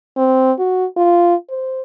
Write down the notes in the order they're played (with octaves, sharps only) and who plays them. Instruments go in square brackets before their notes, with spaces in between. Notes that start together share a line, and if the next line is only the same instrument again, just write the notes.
[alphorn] C4
F#4
F4
C5